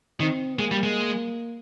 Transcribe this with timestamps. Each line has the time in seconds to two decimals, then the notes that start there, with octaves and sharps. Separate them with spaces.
0.20 D#3 C4
0.58 G#3 A#3
0.71 G3
0.83 G#3